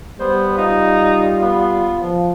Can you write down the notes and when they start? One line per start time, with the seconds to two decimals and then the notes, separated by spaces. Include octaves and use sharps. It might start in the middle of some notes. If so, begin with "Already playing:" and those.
0.20 G3 B3 C5
0.58 D#4 F4
1.42 B3
2.01 F3